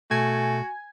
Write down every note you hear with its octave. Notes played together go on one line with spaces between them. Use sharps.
B2 A3 F#4 G#5